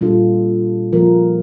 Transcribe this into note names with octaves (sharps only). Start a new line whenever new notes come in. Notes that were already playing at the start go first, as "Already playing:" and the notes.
A#2 G3 D4 F4 A4
F3 A#3 F4 A#4